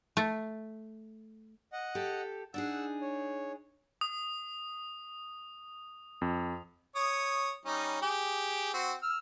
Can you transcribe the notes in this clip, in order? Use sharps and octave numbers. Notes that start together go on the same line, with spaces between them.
A3
D#5 F#5
G4 A4
D4 D#4 G#4 F#5 E6
C#5
D#6
F2
C#5 D#6
G3 C#4 D#4
G4 G#4
C4 F#4
E6 F6